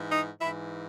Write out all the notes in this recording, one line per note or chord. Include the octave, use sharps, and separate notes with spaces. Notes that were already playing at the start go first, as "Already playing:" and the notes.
Already playing: G#2 E3
D#4
G#2 E3 E4